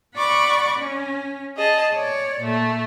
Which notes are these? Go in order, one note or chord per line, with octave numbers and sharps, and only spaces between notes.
D5 F#5 B5 C#6 D6
C#4
G#4 D#5 A5
C#5 D5
A#2 A3